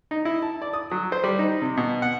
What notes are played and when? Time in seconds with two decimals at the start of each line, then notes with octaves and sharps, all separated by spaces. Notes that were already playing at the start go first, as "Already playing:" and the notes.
0.11 D#4
0.25 E4
0.42 A5
0.62 D5
0.73 D#6
0.91 F#3
1.12 C5
1.24 G3
1.39 D#4
1.62 C3
1.77 B2
2.02 F#5